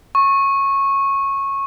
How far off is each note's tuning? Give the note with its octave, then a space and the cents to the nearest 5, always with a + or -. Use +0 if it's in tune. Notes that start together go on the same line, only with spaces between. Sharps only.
C#6 -15